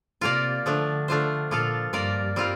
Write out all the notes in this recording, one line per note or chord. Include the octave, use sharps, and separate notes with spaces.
C3 A#3 F4 A#4 D5
D3 F3 A3 D4
A3 D4 F4 C5
A#2 F3 A#3 F4 A4
G2 A#3 F4 A#4 D5
G3 C4 F4 A#4